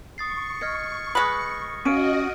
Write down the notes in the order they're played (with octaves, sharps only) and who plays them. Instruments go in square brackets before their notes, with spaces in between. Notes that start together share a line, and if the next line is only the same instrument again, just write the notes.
[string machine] C#6 [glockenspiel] D#6 A6 C7
[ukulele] D#5 [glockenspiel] F6 G#6 C#7
[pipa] G#3 B4 [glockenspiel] D#6 A#6 C#7
[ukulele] C#4 F5 [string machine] F#4 D#5 [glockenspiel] F6 D7 D#7